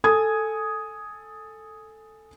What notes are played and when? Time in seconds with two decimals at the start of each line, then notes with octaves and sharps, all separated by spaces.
0.04 A4 G#5 D#6 G#6